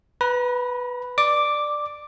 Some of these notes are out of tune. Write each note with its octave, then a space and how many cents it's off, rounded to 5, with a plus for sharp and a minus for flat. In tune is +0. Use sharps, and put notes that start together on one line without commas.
B4 +0 A#5 +45
D5 +15 D6 +0